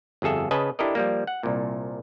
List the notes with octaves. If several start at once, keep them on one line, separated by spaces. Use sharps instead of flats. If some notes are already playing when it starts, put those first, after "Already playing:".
G1 F2 G#4 A4 E5
C#3 B4 D#5 G#5 A5
D4 E4 G4 A4 A#4 D#5
F3 G3 A#3
F#5
C2 A#2